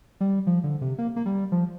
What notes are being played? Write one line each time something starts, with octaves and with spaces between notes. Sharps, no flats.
G3
F3
D3
C3
A#3
A#3
G3
F3